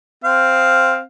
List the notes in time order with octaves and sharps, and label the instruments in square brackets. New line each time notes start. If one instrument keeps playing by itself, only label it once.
[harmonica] C4 F5